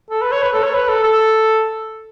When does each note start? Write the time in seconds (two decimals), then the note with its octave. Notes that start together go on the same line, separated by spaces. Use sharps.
0.10 A4
0.22 B4
0.32 C#5
0.42 B4
0.53 A4
0.63 C#5
0.74 B4
0.89 A4
1.03 A4